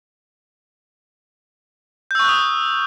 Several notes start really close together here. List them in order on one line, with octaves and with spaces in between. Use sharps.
G6 E6 C#6 F#6 D#6